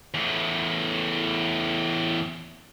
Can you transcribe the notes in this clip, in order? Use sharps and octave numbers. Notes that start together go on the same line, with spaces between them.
E2 A2